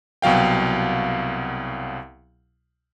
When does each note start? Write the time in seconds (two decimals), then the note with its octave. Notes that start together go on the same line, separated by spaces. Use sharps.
0.22 C2 B2 F#3 F5 G5